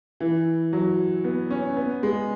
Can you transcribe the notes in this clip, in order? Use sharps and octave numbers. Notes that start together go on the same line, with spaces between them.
E3
F#3
B3
C#4
B3
G#3